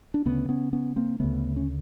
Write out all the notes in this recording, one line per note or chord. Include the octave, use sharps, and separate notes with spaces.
D4
D2 C#3 B3 C#4
B3 C#4
B3 C#4
A#3 C4
D2 C#3 A3 B3
C#4